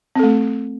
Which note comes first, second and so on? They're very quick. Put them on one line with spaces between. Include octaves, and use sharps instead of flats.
C4 A4 A3